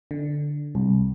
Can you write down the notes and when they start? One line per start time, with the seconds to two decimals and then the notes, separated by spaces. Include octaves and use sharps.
0.11 D3
0.75 C2